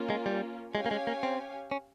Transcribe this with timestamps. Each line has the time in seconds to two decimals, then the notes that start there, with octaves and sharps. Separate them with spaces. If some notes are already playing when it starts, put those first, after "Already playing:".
Already playing: A#3 C#4 F4
0.10 G#3
0.26 G3
0.74 G#3 C#4 G4 C#5 F5 G#5
0.86 A#3
0.91 G#3
1.07 A#3
1.23 C4
1.71 C#4